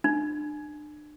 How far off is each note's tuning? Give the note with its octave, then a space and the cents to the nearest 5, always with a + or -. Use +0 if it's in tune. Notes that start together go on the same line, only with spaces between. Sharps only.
D4 +35